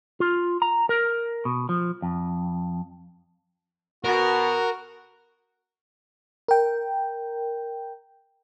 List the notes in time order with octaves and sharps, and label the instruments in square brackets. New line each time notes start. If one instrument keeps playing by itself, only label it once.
[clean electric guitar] F4
A#5
A#4
B2
F3
F2
[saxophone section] B2 [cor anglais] F#4 [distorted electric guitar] A#4
[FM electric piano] A#4 G5